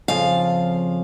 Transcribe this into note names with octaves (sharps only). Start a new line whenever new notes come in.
F2 C#3 F3 F5